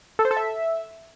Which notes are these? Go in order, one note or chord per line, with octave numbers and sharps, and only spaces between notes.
A4
C5
A4
E5